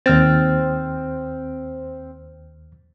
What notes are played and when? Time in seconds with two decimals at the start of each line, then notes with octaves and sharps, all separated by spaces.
0.06 D#2 C4 F6 A6